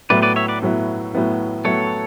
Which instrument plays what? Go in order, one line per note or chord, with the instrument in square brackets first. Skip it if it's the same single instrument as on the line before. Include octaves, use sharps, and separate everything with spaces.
[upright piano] A2 F#3 B3 E4 [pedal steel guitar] B4 D5
[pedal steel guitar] B4 D5
C#5 E5
B4 D5
[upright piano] A2 F#3 B3 E4
A2 F#3 B3 E4
[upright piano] A2 F#3 B3 E4 [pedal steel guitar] A4 C#5